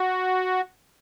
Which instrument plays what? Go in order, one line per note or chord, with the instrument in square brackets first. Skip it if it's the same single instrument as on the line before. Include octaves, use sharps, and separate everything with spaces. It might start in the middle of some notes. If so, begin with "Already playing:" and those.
Already playing: [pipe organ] F#4